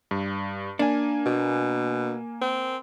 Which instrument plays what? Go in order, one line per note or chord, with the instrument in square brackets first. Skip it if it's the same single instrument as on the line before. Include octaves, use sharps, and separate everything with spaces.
[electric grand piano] G2
[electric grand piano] A#3 G#5 [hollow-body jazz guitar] D4
[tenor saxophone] B2
C4